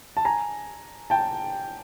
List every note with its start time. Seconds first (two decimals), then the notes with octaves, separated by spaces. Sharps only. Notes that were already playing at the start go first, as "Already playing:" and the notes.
0.17 A5
0.25 G#5 A#5
1.10 G5 A5